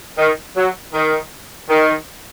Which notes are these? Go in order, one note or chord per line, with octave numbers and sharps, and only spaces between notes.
D#3
F#3
D#3
D#3